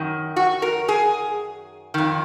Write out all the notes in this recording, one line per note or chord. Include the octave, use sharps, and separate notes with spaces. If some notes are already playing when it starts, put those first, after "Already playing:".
Already playing: F#2 D#3
F#4
A#4
G#4
F2 D#3